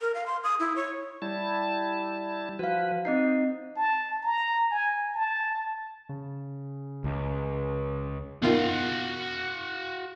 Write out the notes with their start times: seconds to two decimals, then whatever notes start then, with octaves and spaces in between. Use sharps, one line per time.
0.01 A#4
0.14 F5
0.26 C6
0.44 D#6
0.60 E4
0.76 C#5
1.22 G3 E4 A5
2.59 F3 F#4 B4 F5
3.05 C4 D#4 D#5 C7
3.76 A5
4.22 A#5
4.71 G#5
5.15 A5
6.09 C#3
7.04 C#2
8.42 B2 D#3 F4 F#4 F5